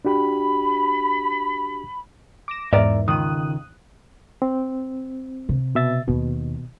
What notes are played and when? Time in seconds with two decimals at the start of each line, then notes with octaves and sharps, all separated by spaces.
0.05 D4 F#4 G4 B5
2.48 D6 A#6 E7
2.73 E2 G#2 A#4 D5 E5
3.08 C#2 D#3 D#6 F#6 D#7
4.42 C4
5.49 C3
5.75 B2 E5 A6
6.07 D#2 B2 D#3